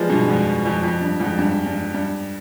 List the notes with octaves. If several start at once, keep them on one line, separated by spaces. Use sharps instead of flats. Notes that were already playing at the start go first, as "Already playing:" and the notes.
Already playing: F3 G3 G#3 B3
G2 B2
F2 G#2
F2
F2
G2
F2 G#2
G2
G2
G2